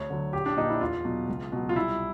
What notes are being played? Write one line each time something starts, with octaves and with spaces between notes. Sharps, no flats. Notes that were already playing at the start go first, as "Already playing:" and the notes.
Already playing: D2 C#5
D3 F#3
A#1 G4
D4
A#2 F3 D#4
E4
E2 F4
B2 F#3
C#2
B2 F#3
F4
C2 E4